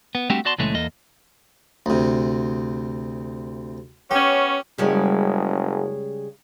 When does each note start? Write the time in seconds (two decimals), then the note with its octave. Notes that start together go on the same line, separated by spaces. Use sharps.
0.15 B3
0.30 G3 A3 C4 D4 F#4 G4
0.45 B3 F#4 D5 A5 C6
0.58 C#2 A#2 E3 G#3 A3 C#4
0.74 E2 A#3 A4 D#5
1.86 D2 C3
4.11 B3 C#4 G4
4.78 F#1 C#3 G3 G#3